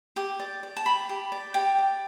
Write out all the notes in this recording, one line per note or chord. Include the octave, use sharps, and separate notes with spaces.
G4 D6
D5
D5
A5
G4 B5
G4
D5
G4 G5
D5